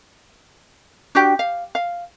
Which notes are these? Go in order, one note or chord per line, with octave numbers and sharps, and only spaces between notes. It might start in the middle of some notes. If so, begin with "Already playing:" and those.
D4 F#4 G4 G5
F5
F5